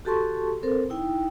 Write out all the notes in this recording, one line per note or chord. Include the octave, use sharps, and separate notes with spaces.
F#4 G4 A4 A5 C6 C#6
C4 A4 A#4 C5
D#4 E4 G5